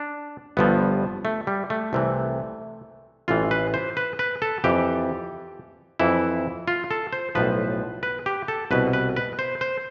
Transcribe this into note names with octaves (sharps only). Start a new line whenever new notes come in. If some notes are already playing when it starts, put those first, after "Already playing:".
Already playing: D4
G1 G2 F3 B3
A3
G3
A3
C2 C3 E3
A1 A2 E3 F4
B4
C5
B4
B4
A4
F2 E3 G4
F2 E3 E4
F4
A4
C5
B1 A2 F3 B4
B4
G4
A4
C2 B2 B4
B4
B4
C5
C5